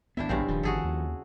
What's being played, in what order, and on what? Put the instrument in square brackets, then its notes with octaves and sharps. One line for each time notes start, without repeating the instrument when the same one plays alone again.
[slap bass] G#1 D2 B3 [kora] D4 E4 E5
[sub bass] A#1 [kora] G2 C#3 C4
[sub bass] D#1 [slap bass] D#3 F3
[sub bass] G1 [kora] F#4 G#4 A4
[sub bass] D#2